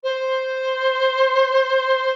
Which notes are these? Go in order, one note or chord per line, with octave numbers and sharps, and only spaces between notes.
C5